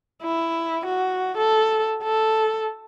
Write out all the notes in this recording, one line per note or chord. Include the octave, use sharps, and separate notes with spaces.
E4
F#4
A4
A4